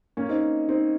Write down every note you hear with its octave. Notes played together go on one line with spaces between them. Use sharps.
A#3 C#4
C4 D#4
C4 D#4